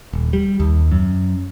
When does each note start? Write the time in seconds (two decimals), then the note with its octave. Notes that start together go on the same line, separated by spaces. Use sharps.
0.13 D#1
0.33 G3
0.60 D#2
0.92 F#2